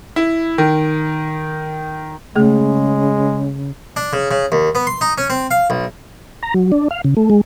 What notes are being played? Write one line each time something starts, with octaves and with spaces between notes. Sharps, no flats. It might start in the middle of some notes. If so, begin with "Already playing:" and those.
E4
D#3
C#3 G#3 A3 G#4
D4
C#3
C#3
D#2
B3
C6
D#4
C#4
C4
F5
B1
A#5
F#3
D4
F5
C#3
A3
G#3